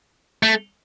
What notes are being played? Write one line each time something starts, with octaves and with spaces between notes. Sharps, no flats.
A3